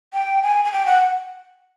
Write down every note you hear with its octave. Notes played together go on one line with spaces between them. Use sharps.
G5
G#5
G#5
G5
F#5